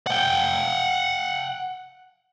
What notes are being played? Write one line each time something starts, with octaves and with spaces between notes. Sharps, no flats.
F#5 G5